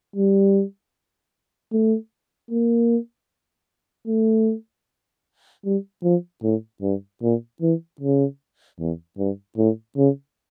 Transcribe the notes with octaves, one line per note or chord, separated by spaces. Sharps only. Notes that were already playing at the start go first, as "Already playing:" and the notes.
G3
A3
A#3
A3
G3
F3
A2
G2
A#2
E3
C#3
E2
G2
A2
C#3